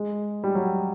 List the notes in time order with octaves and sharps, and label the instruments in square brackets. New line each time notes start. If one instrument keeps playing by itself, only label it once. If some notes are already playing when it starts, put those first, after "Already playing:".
Already playing: [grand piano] G#3
G3
F#3